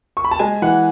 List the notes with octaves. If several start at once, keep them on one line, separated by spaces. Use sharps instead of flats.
C#6
B5
A5
G#3 G#5
E3 F#5